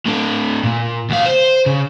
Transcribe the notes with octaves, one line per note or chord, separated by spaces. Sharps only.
A2 D3
A#2
D2 F5
C5
C#3